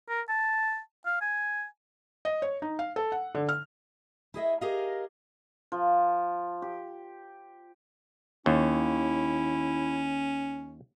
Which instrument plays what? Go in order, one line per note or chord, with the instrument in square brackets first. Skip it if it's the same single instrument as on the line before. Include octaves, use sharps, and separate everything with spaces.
[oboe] A#4
A5
F5
G#5
[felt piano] D#5
C#5
D#4
F5
A4
F#5
D3
F6
[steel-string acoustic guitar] E4 G#4 D#5 E5
G4 G#4 A#4 D#5 F5
[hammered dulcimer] F3
G4
[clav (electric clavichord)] D#2 [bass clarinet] C#4 [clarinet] E4